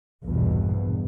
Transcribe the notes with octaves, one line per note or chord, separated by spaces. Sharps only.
A#1 E2 G2 B2